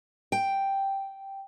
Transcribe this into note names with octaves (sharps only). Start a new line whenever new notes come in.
G5